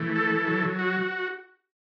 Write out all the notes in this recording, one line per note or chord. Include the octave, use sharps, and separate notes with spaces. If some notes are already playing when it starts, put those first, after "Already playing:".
Already playing: E3 A3
A4
F#3
F#4